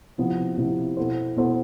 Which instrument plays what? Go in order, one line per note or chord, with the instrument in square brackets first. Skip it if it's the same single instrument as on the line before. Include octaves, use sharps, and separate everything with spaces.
[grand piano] C3 F3 B3 E4
C3 F3 B3 E4
B2 B3 E4 A4 C5
B2 B3 E4 A4 C5